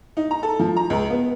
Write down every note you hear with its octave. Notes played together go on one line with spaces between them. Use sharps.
D#4
A#5
A4
F3
A#5
C#2
B3